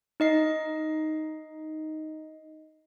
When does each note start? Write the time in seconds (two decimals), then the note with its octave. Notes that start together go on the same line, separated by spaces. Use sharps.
0.20 D#4 D#5 C7